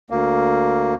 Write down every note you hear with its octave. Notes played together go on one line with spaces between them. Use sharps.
D2 A#3